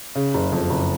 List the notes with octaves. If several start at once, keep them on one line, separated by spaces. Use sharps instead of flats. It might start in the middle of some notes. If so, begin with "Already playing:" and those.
C#3
F#1
F2
F#1